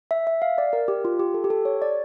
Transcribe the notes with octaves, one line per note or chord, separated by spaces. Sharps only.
E5
E5
F5
D5
A#4
G4
F4
G4
A4
G4
A4
C#5
D5